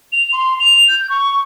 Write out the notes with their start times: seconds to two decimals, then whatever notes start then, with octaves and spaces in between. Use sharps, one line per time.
0.12 F7
0.33 C6
0.60 F7
0.88 G6
1.10 C#6